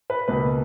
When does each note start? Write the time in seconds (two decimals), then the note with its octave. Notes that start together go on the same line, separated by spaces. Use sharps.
0.10 B4
0.28 C#2 B2 A#3 B4